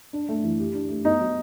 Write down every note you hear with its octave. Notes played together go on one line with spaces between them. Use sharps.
D4
A3
E3
G4
D4
A3
B3 D#4
F#3